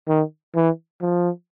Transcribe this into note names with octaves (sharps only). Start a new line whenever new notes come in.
D#3
E3
F3